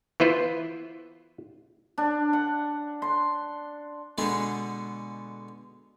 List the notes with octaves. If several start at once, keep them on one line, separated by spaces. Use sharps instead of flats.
E3 B3 E4 F4 B4 C5
D4
F#5
C6
B2 D3 G#3 B3